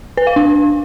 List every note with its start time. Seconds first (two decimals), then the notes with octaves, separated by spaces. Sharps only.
0.17 B4
0.27 F5
0.36 D4